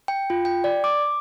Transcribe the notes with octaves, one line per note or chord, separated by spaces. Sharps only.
G5
F4
G5
D5
D6